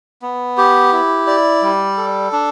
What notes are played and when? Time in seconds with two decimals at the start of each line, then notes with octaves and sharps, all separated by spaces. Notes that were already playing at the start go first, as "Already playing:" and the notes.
0.22 B3
0.58 G4
0.93 E4
1.27 D5
1.62 G3
1.98 A4
2.33 D4